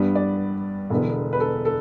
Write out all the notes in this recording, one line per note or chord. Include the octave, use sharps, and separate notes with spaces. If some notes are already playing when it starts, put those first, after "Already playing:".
Already playing: G2 G3 B3 D4
D5
E1 E2 D3 B3
B4
A4
A4